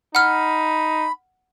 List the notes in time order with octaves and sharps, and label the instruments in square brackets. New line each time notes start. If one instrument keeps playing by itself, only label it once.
[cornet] D#4 [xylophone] F#5 F6 [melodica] B5